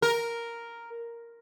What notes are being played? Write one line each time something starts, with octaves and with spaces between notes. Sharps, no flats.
A#4